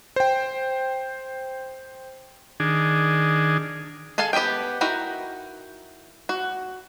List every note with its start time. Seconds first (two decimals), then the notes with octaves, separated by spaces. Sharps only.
0.16 C5 G5
2.60 D#3 D4 G#4
4.18 G#4 A4 F5 G#5 A5
4.33 B3 G4 D#5 E5 G5
4.81 D#4 E4 F#4 A#4 G5
6.29 F#4